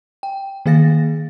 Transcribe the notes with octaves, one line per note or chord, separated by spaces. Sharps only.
G5
D#3 A#3 G#4 F5 A6 A#6